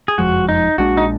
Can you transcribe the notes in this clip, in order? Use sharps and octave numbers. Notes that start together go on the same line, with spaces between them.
G#4
F#1 F2 F3 G#3 F#4
D#4
A#1 A#2 G#3 D4 F#4
D#4